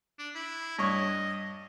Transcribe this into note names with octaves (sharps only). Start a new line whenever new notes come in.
D4
E4
G2 C#5 D#5 C#6